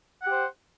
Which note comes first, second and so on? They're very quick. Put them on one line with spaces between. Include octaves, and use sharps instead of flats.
F#5 G4 C5